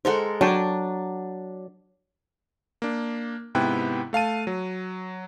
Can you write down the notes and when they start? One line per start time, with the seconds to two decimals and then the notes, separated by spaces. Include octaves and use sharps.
0.05 G#3 A4 A#4 C5 F#5
0.41 F#3 D4 C#5 G5 A5
2.82 A#3 D4
3.55 G#2 C3 B3 E4 G5 F#6
4.13 A3 F5 A5 D#7
4.47 F#3